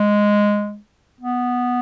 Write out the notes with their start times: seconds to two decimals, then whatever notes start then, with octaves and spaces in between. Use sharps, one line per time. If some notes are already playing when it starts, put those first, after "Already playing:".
Already playing: G#3
1.21 B3